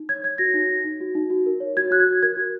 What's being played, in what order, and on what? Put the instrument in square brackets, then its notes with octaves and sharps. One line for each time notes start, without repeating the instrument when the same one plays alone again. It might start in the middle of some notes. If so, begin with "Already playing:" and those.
Already playing: [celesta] D#4
C#5 G#6
C#5 G#6
F#4 A#6
D#4
D#4
D#4
F#4
D#4
F#4
A#4
C#5
F#4 G#6
F#4 F#6
G#6
F#4
A#4 G#6
F#4